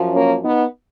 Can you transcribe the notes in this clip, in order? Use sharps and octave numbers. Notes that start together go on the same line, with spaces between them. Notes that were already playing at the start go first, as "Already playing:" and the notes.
Already playing: F#2 F3
A#3 C#4
B3 D#4